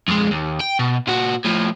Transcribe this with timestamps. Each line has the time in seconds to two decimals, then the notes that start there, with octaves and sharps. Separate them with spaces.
0.08 F2 G#3
0.31 D#2
0.61 G5
0.79 B2
1.07 A#2 F#4
1.45 A2 F3